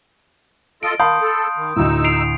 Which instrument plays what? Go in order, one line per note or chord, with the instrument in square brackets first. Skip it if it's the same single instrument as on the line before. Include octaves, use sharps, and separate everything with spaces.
[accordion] F4 A4 D#5 [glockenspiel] D7
[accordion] D#3 [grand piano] F5 A5 B5 [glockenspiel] C6 D#6 G6
[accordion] A4
D#3
[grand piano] D2 A2 [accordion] D#4 E6
[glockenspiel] C7 D7 F7